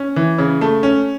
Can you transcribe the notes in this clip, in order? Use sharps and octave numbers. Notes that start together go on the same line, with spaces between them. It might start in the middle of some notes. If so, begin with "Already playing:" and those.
Already playing: C#4
E3
C#3
A3
C#4